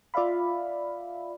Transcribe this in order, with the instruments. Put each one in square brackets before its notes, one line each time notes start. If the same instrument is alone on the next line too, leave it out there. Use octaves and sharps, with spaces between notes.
[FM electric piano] F4 D5 E5 F5 B5